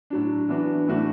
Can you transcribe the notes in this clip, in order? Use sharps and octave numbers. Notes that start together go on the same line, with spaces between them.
A2 F#3 D4
E3 B3 D4 F#4
A2 E3 A3 D4 F#4